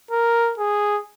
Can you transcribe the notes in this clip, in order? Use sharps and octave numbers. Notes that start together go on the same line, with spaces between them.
A#4
G#4